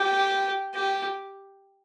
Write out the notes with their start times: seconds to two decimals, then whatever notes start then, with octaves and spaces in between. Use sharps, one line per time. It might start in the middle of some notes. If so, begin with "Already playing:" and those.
Already playing: G4
0.74 G4